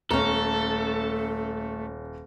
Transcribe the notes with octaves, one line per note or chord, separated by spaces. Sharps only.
D#1 A3 C#4 A4 A#5